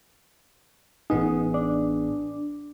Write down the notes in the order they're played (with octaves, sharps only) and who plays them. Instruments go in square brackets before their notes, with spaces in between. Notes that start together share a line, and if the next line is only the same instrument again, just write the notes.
[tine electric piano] A1 B3 G#4 [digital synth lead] D#4
[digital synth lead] D4